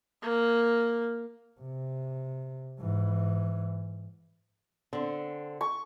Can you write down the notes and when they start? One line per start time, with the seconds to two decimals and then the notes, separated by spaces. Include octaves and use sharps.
0.22 A#3
1.60 C3
2.80 G#2 E3
4.93 D3 C4
5.61 C#6